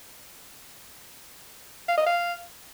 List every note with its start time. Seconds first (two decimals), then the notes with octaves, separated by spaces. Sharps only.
1.88 F5
1.97 D#5
2.06 F5